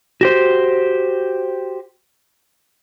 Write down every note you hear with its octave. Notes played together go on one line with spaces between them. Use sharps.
F#4 G4 C5